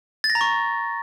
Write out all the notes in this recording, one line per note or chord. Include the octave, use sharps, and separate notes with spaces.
A6
A#6
A#5
C#6